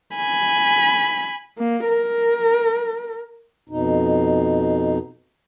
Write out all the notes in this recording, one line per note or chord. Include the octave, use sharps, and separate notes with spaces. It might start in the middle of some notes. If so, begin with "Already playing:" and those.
G#5 B5
A#3
A#4
F2 B2 D#4